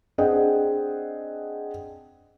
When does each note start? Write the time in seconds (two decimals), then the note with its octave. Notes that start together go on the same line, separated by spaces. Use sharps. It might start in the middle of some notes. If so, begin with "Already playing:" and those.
0.18 C4 D4 G#4 D#5 F#5 G5